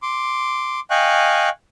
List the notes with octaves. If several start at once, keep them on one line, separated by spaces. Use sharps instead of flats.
C6 D6
D#5 F5 G5 G#5 C#6 F#6